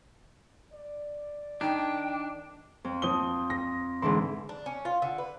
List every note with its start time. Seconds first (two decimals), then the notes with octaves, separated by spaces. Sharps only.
0.73 D5
1.61 D#3 D4 G5
2.84 F2
3.02 F3 D#6 G7
3.50 A#6
4.02 G#2 D3 E3 C6
4.49 D4
4.66 C#4
4.85 F4
5.02 D3
5.18 B4